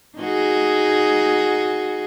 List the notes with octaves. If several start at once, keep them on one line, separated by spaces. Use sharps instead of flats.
D#4 F#4 G#4